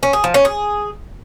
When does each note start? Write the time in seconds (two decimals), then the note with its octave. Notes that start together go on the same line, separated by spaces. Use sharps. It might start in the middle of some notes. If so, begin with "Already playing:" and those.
0.03 C#4
0.13 G#4
0.24 F3
0.34 C#4
0.45 G#4